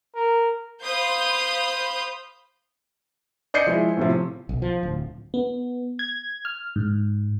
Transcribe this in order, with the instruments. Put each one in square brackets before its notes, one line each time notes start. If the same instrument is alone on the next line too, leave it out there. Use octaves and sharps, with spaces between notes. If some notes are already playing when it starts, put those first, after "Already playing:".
[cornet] A#4
[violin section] C5 F5 B5 C6 D#6 G6
[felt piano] D5 D#5 G6 C7 C#7
F3 G#3 E4
A2 C3 F3
[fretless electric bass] B1
F3
D1
[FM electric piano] B3
G#6
F6
G#2